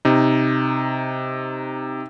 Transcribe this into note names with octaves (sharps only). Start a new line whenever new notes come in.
C3 D#4